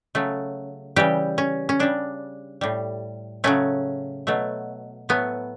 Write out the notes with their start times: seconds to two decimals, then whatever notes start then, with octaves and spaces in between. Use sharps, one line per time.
0.15 C#3 F#3 A3
0.96 C#3 E3 G3 G4
1.38 C#4
1.69 C#4
1.79 C#3 G3 D4
2.61 A2 G3
3.44 C#3 F#3 A3 C#4
4.27 B2 F#3 A3
5.09 A2 F#3 A3 B3